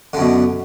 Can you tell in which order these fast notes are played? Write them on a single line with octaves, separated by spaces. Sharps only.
D3 F#2 B2